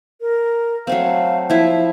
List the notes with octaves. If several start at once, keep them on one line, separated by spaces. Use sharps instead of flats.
A#4
F#3 A3 C4 F5
F3 E4 E5